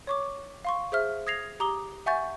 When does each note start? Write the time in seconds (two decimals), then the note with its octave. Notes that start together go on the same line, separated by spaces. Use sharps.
0.07 C#5 C#6 D6
0.65 F5 C6 C#6
0.92 G#4 C5 E5 F6
1.27 D#6 G#6 A#6 C7 F7
1.60 G4 A#5 D6 D#6 G7
2.06 E5 F#5 G#5 C#6 G6 A6